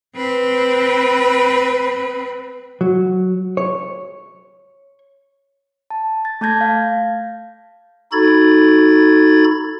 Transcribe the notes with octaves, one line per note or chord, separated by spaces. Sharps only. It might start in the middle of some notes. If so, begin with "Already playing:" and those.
C4 B4
F#3
C#5
A5
A6
A3 A5 G6 G#6 A#6
F5
D#4 F#4 A4 B5 G#6 A6